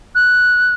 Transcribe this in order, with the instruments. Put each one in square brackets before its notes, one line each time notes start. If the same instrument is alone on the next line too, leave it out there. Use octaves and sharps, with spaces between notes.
[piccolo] F#6